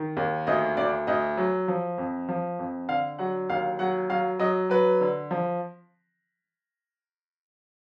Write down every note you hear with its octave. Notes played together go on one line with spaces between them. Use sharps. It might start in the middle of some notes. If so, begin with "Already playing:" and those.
Already playing: D#3
D#2
D2 D#5
D2 D5
D2 D#5
F#3
F3
F2
F3
F2
D3 F5
F#3 F#5
D#2 F5
F#3 F#5
F#3 F5
F#3 D#5
F#3 B4
D3
F3